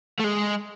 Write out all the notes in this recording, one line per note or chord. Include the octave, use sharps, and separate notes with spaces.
A3
G#3